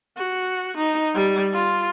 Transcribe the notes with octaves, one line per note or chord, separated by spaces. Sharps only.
F#4
D#4
G3
F4